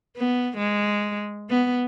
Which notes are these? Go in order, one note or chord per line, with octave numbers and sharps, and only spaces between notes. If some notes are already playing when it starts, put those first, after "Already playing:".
B3
G#3
B3